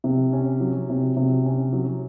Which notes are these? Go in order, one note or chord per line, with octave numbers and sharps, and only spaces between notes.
C3
C#4
F#3
C3
C3
C#4
F#3